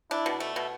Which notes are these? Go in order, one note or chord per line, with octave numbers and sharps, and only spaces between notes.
D4 E4
B2
A3
B2